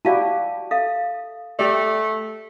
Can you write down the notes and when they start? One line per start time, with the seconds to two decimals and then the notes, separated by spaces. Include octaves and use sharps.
0.05 E4 F#4 G4 D5 F5 A5
0.71 A4 E5 F5
1.59 A3 G4 D5